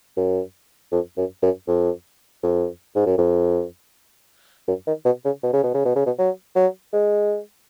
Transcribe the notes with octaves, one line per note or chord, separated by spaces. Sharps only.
F#2
F2
F#2
F#2
F2
F2
G#2
F#2
F2
F#2
D#3
B2
C#3
B2
C#3
B2
C#3
B2
C#3
B2
F#3
F#3
G#3